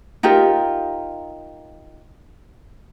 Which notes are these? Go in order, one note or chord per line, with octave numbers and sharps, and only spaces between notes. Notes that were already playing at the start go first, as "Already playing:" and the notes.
D#4 F4 G4 A#4